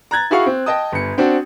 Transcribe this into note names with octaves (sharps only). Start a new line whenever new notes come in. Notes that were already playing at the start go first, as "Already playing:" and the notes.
A#5 F#6 G#6 A6
E4 F#4 G#4 F5 C#6
C4
D#5 G5 A5 D#6
G1 C#7
C4 D4 F#4